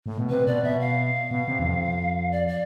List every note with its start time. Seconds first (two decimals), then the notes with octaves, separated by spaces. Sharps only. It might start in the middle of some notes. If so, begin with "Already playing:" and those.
0.06 A2
0.18 B2
0.30 C3 B4
0.47 B2 D5
0.63 B2 E5
0.80 F5
1.31 B2
1.48 C3
1.59 E2
1.64 F2
2.31 D5
2.48 D5